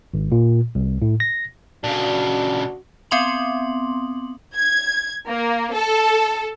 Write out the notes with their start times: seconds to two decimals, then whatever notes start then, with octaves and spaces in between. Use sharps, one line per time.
0.14 G#1
0.32 A#2
0.75 C2
1.02 A2
1.20 A#6
1.84 A#2 C#3 D4 F#4
3.11 B3 C4 C6 F#7
4.56 G#6
5.28 A#3
5.74 A4